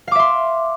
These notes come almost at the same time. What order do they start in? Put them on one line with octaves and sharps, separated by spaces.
F5 D6 E5 C6